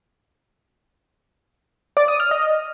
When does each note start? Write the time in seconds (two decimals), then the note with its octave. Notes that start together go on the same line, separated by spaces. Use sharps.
1.97 D5
2.08 D#6
2.20 F6
2.31 D#5